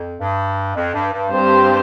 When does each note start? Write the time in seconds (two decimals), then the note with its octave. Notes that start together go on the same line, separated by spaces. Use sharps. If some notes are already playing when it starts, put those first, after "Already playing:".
Already playing: F2
0.20 G2
0.75 F2
0.94 G2
1.13 G2
1.31 G2 G3 C4 G4 C5